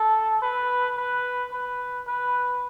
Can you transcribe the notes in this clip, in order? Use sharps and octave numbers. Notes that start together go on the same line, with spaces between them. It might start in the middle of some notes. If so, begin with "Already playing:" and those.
Already playing: A4
B4
B4
B4
B4